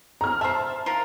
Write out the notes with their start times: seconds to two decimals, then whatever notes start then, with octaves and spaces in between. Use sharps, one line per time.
0.21 A#5 F6
0.41 C5 E5 A5
0.86 F3 F4 A#4